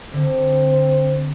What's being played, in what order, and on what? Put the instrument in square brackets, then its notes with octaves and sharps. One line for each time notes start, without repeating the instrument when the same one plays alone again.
[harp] D3 [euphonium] C4